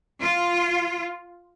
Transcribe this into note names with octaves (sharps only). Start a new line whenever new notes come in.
F4